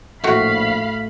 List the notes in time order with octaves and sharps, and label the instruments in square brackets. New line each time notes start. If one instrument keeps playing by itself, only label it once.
[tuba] A#1 [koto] A2 F#4 [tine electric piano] A3 [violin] F5 B5